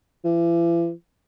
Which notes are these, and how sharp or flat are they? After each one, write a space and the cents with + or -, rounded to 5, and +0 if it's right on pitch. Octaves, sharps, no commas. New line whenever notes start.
E3 +40